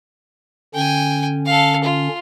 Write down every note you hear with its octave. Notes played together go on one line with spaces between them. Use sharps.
D3 C#4 G5 G#5
A4 F5
F4